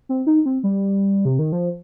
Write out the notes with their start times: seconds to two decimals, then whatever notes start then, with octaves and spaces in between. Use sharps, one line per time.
0.09 C4
0.27 D#4
0.46 C4
0.63 G3
1.25 C3
1.39 D#3
1.52 F3